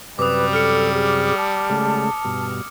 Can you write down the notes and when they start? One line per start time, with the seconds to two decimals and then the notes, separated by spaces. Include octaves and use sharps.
0.19 F#2 C3 G3 B4 D6 D#6
0.53 A4 F6 C#7
0.94 G#4
1.37 A5
1.70 C#3 G#3 A3
2.25 G2 B2